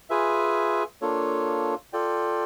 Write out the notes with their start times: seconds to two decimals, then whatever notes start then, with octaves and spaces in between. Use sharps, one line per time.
0.10 F4 G#4 B4 E5 G#5
1.01 A#3 D4 F4 A4 C#5
1.93 F4 A4 D5 G5